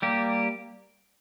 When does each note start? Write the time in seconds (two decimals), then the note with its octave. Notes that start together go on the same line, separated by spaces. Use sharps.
0.02 G3 A#3 G4